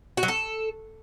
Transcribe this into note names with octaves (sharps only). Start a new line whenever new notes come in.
F#4
F#3
A4